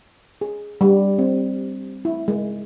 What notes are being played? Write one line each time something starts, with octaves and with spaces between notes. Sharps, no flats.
G#4
G3
C4
E4
G#3